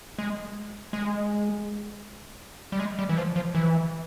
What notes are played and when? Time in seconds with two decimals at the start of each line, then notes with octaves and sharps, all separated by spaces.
0.19 G#3
0.93 G#3
2.72 G3
2.80 G#3
2.99 G3
3.09 E3
3.17 F3
3.36 F3
3.55 E3